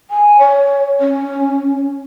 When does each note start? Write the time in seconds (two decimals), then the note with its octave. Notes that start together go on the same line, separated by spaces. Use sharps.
0.11 G#5
0.39 C#5
1.00 C#4